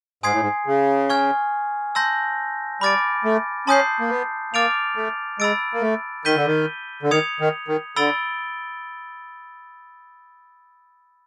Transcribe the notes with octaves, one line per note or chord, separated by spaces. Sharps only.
G#2 G#5 C6 D#6 G#6 C7
A2
G#2
C#3
G#5 C#6 F6 G#6
A5 C6 E6 G6 A#6
G3 B5 D6 F6 A6 D7
A3
C#4 A5 C6 D#6 G6 C7
A#3
B3
A#3 D6 F6 A6 D7 F7
A3
G#3 B5 E6 A6 D7
A#3
A3
D#3 G6 B6 D#7 G7
D3
D#3
D3
D#3 D#6 G#6 C#7 F7
D#3
D#3
D3 B5 E6 A6 D7 G7